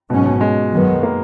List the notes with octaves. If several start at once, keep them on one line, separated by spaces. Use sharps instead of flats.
G#2 B2 F#3 C#4
B2
G#3
F#2 D#3 F#3 B3
A#3